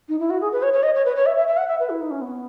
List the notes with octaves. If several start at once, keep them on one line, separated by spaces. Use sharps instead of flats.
D#4
E4
F#4
G#4
B4
C#5
C#5
D#5
C#5
B4
C#5
E5
E5
E5
F#5
E5
B4
E4
D#4
C#4
B3